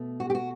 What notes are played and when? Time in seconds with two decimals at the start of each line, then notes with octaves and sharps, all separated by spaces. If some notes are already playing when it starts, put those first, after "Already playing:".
Already playing: B2 A3
0.20 F#4
0.30 G4
0.35 F#4